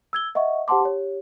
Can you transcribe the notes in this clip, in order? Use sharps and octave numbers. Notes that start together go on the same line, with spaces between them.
E6 G#6 G7
D#5 E5 F#5 C#6
G4 C5 F#5 A5 C6 D6
G4 C#5